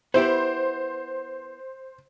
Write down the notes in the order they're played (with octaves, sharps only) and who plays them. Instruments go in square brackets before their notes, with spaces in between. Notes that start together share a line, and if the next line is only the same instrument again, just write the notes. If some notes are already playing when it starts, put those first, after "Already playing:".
[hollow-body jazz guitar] B3 E4 G4 [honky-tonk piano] C5